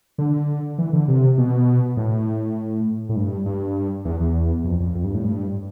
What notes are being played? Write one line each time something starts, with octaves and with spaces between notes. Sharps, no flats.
D3
E3
D3
C3
B2
A2
A2
G2
G2
E2
E2
F2
F2
F2
G2
A2
G2